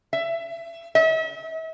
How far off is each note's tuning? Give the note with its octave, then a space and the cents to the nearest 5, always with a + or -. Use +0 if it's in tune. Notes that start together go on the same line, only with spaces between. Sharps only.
E5 +25
E5 -40